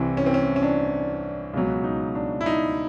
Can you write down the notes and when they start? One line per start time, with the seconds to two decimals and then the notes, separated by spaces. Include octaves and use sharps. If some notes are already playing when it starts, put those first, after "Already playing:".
Already playing: C2 C3 E3 C4
0.17 C#4
0.26 C4
0.34 C#4
0.56 C#4
0.63 D4
1.54 C#2 B2 F#3
1.84 D#4
2.15 D4
2.41 E4
2.46 D#4